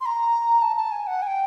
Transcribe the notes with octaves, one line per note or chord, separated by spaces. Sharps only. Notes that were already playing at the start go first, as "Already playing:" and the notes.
C6
A#5
A5
A5
G#5
F#5
G#5
G5